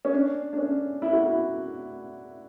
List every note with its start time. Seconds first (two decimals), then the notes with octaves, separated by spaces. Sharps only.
0.05 C#4
0.13 D4
0.53 D4
0.58 C#4
1.02 E4
1.12 F#4
1.23 E4